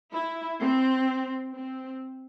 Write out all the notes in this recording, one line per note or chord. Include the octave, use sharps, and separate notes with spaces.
E4
C4
C4